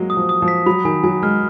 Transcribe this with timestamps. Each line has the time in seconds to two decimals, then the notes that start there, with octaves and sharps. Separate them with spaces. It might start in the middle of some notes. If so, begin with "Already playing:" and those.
Already playing: F#3 G#3 A#3
0.10 D#6
0.17 F3
0.29 D#6
0.42 F3
0.48 B6
0.66 F#3 B5
0.85 D#3 G#5
1.04 F#3 G#5
1.22 G#3 F6